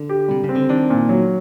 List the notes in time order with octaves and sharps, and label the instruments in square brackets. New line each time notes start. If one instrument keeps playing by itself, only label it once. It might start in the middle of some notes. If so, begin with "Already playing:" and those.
Already playing: [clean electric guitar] D3
[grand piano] G4
[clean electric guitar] C3 [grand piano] G3
[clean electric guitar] C#3 [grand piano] C4
[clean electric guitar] D3
[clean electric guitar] D#3 [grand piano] D4
[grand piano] A#2
F#3